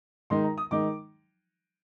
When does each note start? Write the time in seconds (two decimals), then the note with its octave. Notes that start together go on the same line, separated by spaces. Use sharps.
0.30 D#3 G#3 D#4 C6
0.44 A#5
0.58 D#6
0.71 D#3 G#3 D#4 D6